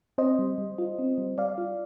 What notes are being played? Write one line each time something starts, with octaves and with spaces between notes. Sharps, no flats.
C4 C5 D#5
G3
G3
F4
C4
G3
G3 D5 F5
F4